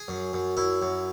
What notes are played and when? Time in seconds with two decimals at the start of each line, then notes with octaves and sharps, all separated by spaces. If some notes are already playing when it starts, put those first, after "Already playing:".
Already playing: G#4
0.08 F#2
0.33 F#2
0.57 F#2 E4
0.82 F#2